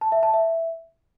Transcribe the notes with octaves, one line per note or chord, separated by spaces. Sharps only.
A5
E5
A5
E5